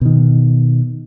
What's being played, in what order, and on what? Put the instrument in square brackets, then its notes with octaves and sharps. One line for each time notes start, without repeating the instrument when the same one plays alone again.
[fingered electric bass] B2 D#3